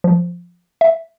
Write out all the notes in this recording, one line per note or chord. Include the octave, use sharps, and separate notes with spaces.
F3
E5